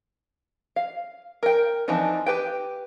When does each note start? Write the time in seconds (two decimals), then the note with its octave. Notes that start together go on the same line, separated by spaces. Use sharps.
0.76 F5
1.43 A#4 G5
1.88 E3 F3 C4 D4 D#4
2.26 G4 B4 G5